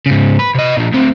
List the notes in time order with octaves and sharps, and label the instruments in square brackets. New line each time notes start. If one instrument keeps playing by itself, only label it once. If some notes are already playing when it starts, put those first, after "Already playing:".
[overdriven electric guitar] G#2 C#3
B4
C3 D#5
A#2 F3
D2 C4